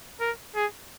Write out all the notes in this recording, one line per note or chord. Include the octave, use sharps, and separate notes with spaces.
A#4
G#4